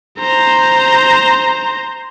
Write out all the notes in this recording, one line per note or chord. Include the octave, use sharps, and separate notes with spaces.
C5 A#5